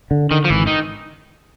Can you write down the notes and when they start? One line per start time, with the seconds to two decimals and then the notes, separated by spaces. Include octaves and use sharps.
0.11 D3
0.31 D3 D#3
0.45 F3
0.50 G#1 E3
0.67 D#3